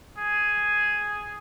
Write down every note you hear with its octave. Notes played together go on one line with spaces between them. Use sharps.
G#4